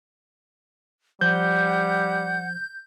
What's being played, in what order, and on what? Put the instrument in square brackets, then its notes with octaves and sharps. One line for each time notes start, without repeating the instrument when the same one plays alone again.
[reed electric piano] F3 C5 [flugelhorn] G3 [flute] F#5 [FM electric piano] G6